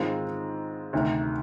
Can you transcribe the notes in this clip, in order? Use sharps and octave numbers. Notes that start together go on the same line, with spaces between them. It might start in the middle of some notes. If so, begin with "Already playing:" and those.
Already playing: G#2 D#3 G#3 C4 F4
D2 C3 D#3